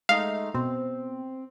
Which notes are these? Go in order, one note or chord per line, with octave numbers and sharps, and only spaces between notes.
G#3 A3 D#4 F5
B2 C4